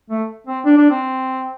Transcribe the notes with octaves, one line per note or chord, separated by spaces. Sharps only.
A3
C4
D4
D4
C4